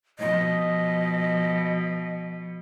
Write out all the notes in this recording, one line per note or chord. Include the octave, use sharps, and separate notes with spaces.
B2 F3 D#5